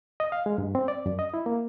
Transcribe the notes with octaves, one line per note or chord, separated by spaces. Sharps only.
D#5
F5
G#3
G2
C4
D5
F#2
D#5
E4
A#3